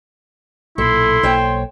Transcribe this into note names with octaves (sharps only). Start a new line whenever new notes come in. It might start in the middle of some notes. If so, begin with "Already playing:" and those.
B1 A#2 E4 A4 C6
B1 F3 A#3 C5 C#5 G5